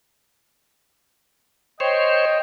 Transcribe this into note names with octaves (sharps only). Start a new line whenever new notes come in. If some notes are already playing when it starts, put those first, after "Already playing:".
C5 C#5 D#5 G5